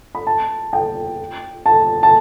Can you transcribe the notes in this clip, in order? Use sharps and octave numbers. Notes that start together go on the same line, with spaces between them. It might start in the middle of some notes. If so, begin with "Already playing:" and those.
B5
A5
G5
A5
A5